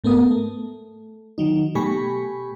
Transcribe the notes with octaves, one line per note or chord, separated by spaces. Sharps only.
G#2 A3 B3 A#4 D#6
A3
D#3 F#3 D#4
B2 A3 G4 G#5 B5 C#6